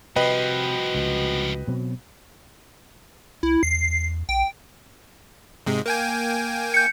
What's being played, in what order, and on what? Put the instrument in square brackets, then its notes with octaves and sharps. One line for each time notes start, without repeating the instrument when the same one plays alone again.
[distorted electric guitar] C2 F3 [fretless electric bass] C3 [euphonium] F#4 [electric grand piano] B4 D#5 G5
[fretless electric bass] C#2
B2 F#3 C4
[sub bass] C2 [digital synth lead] E4
[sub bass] E2 [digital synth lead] C7
[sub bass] A#1 [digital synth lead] G5
[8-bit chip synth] G#2 C3 G#3
A#3 G5 G#5
[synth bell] G6 C#7